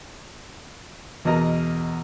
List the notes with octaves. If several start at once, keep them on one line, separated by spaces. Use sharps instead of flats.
E2 B2 A#4 D#5 A#5